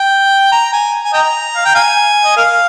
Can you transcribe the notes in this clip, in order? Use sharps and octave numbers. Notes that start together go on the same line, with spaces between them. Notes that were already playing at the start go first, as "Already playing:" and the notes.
Already playing: G5
A#5
G#5
G#5
D#5 G5 A#5
F5
G5
F5 G#5
D#5
A#4 F5